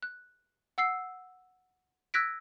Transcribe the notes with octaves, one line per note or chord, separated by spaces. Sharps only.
F#6
F#5 E6 C7
E6 F#6 G#6 A#6 B6 D7